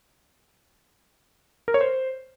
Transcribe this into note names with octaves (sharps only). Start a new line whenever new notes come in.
A#4
C#5
C5